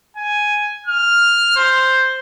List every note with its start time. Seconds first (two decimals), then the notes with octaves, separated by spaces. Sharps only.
0.17 G#5
0.86 F6
1.56 C5